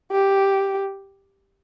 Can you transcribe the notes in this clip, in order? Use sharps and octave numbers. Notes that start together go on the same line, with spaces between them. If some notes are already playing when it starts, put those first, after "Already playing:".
G4